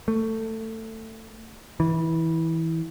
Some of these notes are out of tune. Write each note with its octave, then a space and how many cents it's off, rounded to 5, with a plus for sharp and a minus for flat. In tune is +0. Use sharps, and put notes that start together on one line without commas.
A3 +20
E3 -20